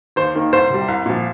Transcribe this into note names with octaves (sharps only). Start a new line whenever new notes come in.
D#2 C5
D#3 A#3
C2 C5
C3 G3
C2
A#2 F3